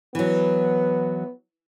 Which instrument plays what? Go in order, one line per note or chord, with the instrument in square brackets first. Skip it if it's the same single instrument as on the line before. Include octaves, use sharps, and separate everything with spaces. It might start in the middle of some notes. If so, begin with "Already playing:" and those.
[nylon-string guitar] E3 F#3 [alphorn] B3